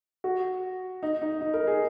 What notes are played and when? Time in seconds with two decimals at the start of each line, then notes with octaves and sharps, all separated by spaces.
0.24 F#4
1.03 D#4
1.22 D#4
1.41 D#4
1.54 A#4
1.67 G#4